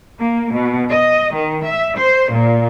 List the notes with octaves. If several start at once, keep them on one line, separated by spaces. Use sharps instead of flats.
A#3
B2
D#5
D#3
E5
C5
A#2